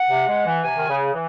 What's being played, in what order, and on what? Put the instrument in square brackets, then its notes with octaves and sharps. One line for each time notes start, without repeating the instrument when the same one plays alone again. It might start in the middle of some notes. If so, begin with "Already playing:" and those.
Already playing: [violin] F#5
[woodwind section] C3
G#3
E3
[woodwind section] C3 [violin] G#5
[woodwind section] D#3
C#3
E3